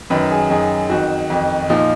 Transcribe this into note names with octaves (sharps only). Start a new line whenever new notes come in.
F#2 D#3 B4
G#4
F#2 D#3 G#4
F2 D#3 F#4
F2 D#3
A#2 F3 D#4